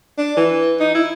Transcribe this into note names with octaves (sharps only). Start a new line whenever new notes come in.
D4
E3
D#4
E4